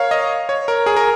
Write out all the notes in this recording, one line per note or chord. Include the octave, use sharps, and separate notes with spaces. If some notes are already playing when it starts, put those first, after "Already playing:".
Already playing: A#4 C#5 F5
D#5
C#5
A#4
G#4
A#4